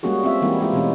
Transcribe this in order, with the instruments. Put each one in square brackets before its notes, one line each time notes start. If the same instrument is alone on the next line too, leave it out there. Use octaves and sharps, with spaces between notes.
[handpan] G3 G#3 A#3 C#4 F#4 G#4
C4 C#4 F4 E5
E3 G3 G#3 A#3 C4 E4
G#3 E4 F4 G4
B2 E3 G#3 C#4